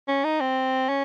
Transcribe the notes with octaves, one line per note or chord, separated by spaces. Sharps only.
C#4
D#4
C4
C#4